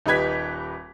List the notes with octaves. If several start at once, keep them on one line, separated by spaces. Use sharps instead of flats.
D#1 D#4 G4 B4 G#6 B6